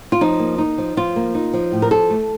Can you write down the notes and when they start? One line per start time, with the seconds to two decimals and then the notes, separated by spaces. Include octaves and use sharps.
0.12 F4
0.21 F3 D#4
0.39 A#3
0.58 D#4
0.78 F3
0.97 F3 F4
1.16 A#3
1.35 D#4
1.53 F3
1.72 A2
1.82 A#4
1.91 F3 A4
2.10 A3